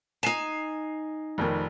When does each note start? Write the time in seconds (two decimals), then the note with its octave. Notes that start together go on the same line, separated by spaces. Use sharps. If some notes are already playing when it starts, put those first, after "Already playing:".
0.23 D#4 G#5 C7 E7
1.38 F1 F2 D#3